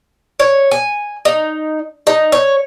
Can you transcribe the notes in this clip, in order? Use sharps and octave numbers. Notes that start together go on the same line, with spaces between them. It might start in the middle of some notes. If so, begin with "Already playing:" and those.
C#5
G#5
D#4
D#4
C#5